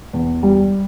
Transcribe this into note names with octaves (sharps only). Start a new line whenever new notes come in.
E2
G3